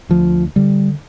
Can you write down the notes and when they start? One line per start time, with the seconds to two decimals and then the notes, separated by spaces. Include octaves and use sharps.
0.09 D2 F3
0.56 D3 G3